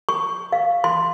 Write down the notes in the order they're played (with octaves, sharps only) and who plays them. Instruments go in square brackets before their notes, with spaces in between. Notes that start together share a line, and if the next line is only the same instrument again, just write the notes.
[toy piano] C#6
F5
C6